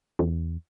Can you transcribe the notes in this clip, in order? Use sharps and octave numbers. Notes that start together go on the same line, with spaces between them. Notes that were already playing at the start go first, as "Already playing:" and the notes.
E2